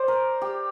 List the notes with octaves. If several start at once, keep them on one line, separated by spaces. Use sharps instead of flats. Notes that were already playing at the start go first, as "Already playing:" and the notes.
Already playing: C5 D5
A#4
G4